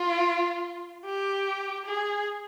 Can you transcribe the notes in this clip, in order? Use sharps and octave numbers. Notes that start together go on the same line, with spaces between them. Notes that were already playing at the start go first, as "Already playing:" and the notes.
Already playing: F4
G4
G#4